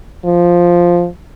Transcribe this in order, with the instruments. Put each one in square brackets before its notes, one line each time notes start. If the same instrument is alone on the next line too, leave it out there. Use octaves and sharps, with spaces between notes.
[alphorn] F3